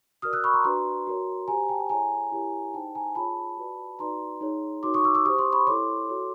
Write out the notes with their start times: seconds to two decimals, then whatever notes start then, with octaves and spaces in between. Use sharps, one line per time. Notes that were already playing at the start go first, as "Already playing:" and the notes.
0.22 F#4 A#4 D5 D#6 F6
0.33 E6 F#6
0.44 B5 C#6
0.53 A#5 C6
0.64 D4 F#4 B4 D5 A#5 C6
1.07 F#4 A#4 C#5
1.48 G4 C5 G#5 A#5
1.69 G5 A5
1.90 E4 G#4 C#5 G#5 A#5
2.32 E4 G4 A#4 C#5
2.74 D#4 G#4 C5 G5 A5
2.95 G#5 A#5
3.15 F4 G#4 C#5 A5 B5
3.58 F#4 B4 D5
3.99 D#4 F#4 B4 D5 A#5 C6
4.41 D#4 G#4 C#5
4.83 D#4 F#4 A#4 C#5 C6 D6
4.94 C#6 D#6
5.04 D6 E6
5.15 D6 E6
5.25 G4 C5 C#6 D#6
5.39 C6 D6
5.53 B5 C#6
5.67 E4 A4 C#5 C6 D6
6.09 F#4 A4 C#5